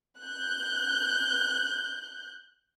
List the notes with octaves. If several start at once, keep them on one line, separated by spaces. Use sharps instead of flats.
F#6 G6